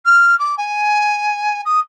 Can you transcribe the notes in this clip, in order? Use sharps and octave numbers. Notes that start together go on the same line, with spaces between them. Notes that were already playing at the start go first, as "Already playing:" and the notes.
F6
D6
G#5
D#6